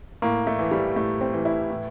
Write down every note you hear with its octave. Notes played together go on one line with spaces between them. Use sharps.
A2 A#3
A3
E3
G3
A2 A3
C4
E3
E4
A2